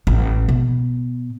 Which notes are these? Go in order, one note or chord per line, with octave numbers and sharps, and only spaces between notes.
A1
B2